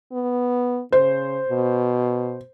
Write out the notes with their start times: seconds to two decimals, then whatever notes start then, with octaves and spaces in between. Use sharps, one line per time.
0.12 B3
0.92 C#3 C5
1.48 B2